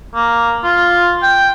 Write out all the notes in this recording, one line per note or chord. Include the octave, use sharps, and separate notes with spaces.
A#3
F4
G5